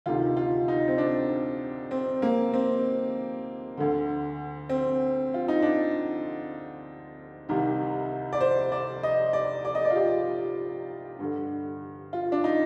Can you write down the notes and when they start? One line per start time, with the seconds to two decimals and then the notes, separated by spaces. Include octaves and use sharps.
0.06 D2 C3 D#3 F4
0.37 F4
0.68 D#4
0.88 C4
0.98 D4
1.91 C4
2.22 A#3
2.53 C4
3.77 D2 D3
4.69 C4
5.34 F4
5.48 D#4
5.62 D4
7.49 C2 C3 D#3
8.33 D5
8.40 C5
8.72 D5
9.03 D#5
9.33 D5
9.65 D5
9.75 D#5
9.85 D5
9.90 F4
9.96 G4
11.19 G2 D3
12.13 F4
12.32 D4
12.44 D#4